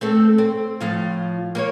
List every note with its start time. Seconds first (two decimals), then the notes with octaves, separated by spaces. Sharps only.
0.01 A3 C4 A4
0.38 C4
0.81 A2 F3 F4
1.55 A#3 B4 C#5